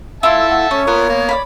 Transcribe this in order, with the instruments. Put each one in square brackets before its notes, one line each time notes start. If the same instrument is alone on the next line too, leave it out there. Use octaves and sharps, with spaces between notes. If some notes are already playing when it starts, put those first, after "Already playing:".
[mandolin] E4 F4 [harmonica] E5 A5
[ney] F#5
[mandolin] C#4 [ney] C#5
[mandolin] B3 [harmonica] F4 A#4
[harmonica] A#3
[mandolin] D5 F5 B5